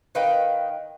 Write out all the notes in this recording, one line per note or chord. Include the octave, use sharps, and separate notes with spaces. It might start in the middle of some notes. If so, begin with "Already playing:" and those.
D#3 B4 F5 G5